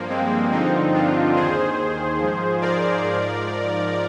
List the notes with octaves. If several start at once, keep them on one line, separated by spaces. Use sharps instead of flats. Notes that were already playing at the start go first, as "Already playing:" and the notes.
Already playing: G2 F3 A#3
G#3 C4
G2 D3 F3 C4 D#4
D4 F4
D#2 D#3 G#4 C5
G#2 F3
A#4 D5
G#2 F3